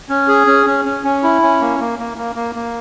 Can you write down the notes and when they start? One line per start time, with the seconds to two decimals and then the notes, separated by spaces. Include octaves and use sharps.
0.09 C#4
0.28 G#4
0.47 C#4
0.66 C#4
0.85 C#4
1.04 C#4
1.23 E4
1.42 C#4
1.61 A#3
1.80 A#3
1.99 A#3
2.18 A#3
2.36 A#3
2.55 A#3